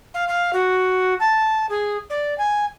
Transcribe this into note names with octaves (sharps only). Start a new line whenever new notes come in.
F5
F5
F#4
A5
G#4
D5
G#5